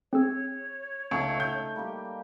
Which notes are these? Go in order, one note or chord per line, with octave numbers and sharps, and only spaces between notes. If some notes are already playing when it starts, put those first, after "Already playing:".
C4 G#4 C#5 E6
C#2 A3 D#4 C#6
G6
G3 A#3 G4